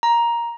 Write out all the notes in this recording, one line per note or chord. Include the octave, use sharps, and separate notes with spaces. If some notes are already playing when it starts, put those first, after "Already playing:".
A#5